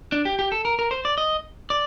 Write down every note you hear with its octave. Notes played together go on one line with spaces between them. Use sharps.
D4
G4
G4
A4
A#4
A#4
C5
D5
D#5
D5